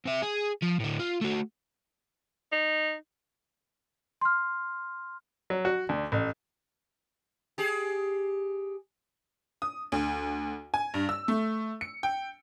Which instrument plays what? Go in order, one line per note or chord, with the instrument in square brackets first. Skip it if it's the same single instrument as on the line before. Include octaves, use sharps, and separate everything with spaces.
[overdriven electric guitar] C3 E5
G#4
F3
A2 D3
F4
A3 F#4
[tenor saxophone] D#4
[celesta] C6 F6
[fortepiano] F#3
F#4
D2
A1
[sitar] G4 G#4
[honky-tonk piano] D#6
D2
G#5
G2
E6
A3
C#7
G5